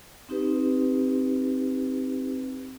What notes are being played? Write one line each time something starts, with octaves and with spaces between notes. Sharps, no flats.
C4 D#4 G4 B4